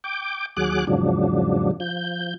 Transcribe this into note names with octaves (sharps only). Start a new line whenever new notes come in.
G5 D6
D#2 F#3 G#4 D6 F#6
E2 G#2 C#3 F3 F#3 D4
F3 G6